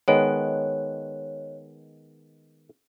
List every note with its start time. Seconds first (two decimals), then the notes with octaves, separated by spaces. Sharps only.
0.08 D#3 G#3 B3 C#5